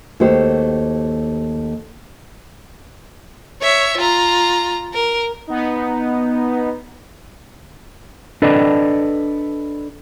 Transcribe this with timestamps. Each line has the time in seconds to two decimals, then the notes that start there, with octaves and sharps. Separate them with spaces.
0.20 D#2 A3 F#4 G4 C5
3.62 C#5 E5
3.97 F4 A#5
4.94 A#4
5.47 B3 D#4
8.42 D4 A4 B4 D5 D#5